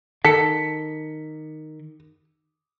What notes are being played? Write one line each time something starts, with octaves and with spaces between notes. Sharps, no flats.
D#3 A4 B6 C#7